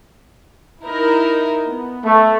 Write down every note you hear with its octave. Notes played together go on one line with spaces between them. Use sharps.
D#4 E4 A#4
B3
A3